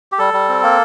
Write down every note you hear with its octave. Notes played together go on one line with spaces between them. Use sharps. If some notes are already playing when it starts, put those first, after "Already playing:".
G4
G3 A4
G3
C4
A#3